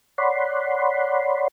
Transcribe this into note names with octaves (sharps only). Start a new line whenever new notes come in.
C#5 D5 F#5 B5 C6